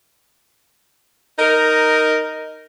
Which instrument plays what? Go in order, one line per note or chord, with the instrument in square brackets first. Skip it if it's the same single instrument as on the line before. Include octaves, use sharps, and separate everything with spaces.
[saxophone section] D#4 A#4